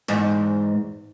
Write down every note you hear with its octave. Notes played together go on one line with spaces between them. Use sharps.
E2 G#2